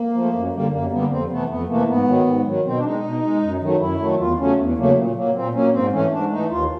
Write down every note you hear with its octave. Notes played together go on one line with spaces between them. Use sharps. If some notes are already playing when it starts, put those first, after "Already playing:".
Already playing: A#3
F3 A3
F#2
D3 G3 A#3
F#2 A#3
D3 G3 A#3 B3
F2 C4
C3 E3 A3 B3
F2 B3
C3 E3 A3 A#3
G#2 B3
D#3 F#3
G#2
D#3 F#3
B2 C4
D4
G#3 D#4
B2
G#3
F#2
D#3 F#3 A3
F#2 E4
D#3 F#3 A3
E2 F4
C#3 F#3 A3 C#4
E2
C#3 F#3 A3 A#3
A#2
F#3 A#3
A#2 C4
F#3 A#3 C#4
G#2 C4
E3 A3 C#4
G#2 D4
E3 A3 D#4
D#2 F4